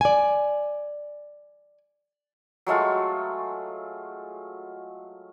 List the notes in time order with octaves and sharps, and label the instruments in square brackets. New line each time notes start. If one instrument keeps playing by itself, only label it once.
[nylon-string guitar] D5 G#5
[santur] F#3 G#3 A3 F4